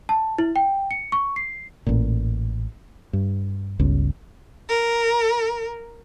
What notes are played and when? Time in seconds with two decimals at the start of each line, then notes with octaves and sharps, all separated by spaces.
0.09 A5
0.38 E4
0.56 G5
0.91 C#7
1.12 C#6
1.36 C7
1.87 A1 A#2
3.13 G2
3.79 G1 C#2
4.70 A#4